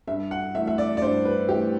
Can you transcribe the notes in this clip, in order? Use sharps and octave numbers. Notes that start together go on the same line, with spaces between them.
G2 E5
F#5
E3 A3 E5
E5
D5
D5
G2 C5
B4
E3 A3 G4